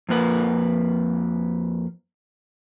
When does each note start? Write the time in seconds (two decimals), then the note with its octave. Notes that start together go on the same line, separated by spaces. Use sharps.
0.09 F2 A#3 B4